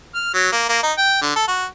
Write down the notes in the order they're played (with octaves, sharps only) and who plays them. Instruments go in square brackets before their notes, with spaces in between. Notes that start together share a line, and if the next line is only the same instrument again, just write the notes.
[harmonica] F6
F#3
A#3
A#3
D#4
G5
D3
A4
F#4